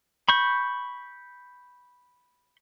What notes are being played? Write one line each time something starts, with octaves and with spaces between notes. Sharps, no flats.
B5 C#6 G6